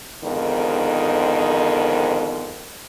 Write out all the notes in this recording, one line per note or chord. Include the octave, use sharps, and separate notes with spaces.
F2 G#2 D3 D#3 B3